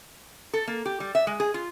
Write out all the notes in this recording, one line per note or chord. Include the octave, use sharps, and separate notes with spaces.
A4
A#3
G4
G3
E5
G#3
G#4
F4